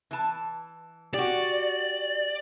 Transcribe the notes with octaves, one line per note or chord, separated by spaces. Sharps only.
E3 A5
F#4 G4 D5